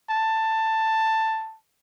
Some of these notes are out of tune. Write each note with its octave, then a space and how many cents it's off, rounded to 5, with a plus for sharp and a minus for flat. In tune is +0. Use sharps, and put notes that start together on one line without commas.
A5 +10